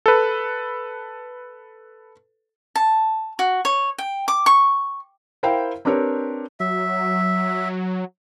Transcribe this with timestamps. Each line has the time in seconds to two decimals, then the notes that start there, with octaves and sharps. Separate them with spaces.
0.06 A4 B4
2.76 A5
3.39 F#4
3.65 C#5
3.98 G5
4.28 D6
4.46 C#6
5.43 E4 A#4 C5 F5 G5
5.85 C4 D4 G4 A#4 B4 C#5
6.60 F#3 E5